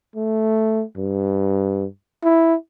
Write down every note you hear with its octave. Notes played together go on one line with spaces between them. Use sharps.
A3
G2
E4